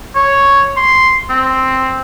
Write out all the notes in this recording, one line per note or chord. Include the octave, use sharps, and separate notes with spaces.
C#5
C6
C4